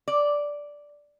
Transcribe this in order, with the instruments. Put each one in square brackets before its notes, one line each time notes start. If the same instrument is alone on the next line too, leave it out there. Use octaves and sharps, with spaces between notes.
[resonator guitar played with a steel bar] D5